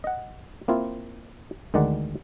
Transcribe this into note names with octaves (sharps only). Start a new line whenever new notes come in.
D#5 F#5
A#3 C4 E4 F4
D2 D#3 G#3 D5 F#5